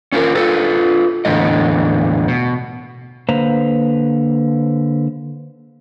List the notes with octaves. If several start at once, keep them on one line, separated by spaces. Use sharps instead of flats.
C#4 F4 F#4 A#4
F4 A4 B4
E2 A2 D3 G3 D#5
B2
D3 A#3 B4 C5 A#5